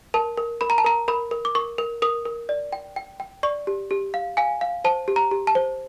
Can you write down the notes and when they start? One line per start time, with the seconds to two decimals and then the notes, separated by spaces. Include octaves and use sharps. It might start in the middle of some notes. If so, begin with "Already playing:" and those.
0.14 A#4 A5
0.37 A#4
0.61 A#4 B5
0.70 A#5
0.78 A5
0.84 A#4 A#5
1.08 A#4 B5
1.31 A#4
1.45 D6
1.55 A#4 C#6
1.78 A#4
2.02 A#4 D#6
2.25 A#4
2.49 D5
2.73 G5
2.96 G5
3.20 G5
3.43 D5 C#6
3.67 G4
3.91 G4
4.14 F5
4.37 F5 G#5
4.61 F5
4.85 C5 A5
5.08 G4
5.16 A#5
5.31 G4
5.47 A5
5.55 C5